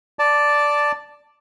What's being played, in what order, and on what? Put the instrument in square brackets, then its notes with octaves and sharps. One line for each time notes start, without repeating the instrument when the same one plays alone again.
[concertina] D5 A5